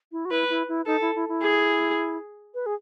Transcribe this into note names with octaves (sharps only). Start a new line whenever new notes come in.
E4
F#4
E4 B4
E4
E4
D#4 A4
E4
E4
E4
G#4
B4
G#4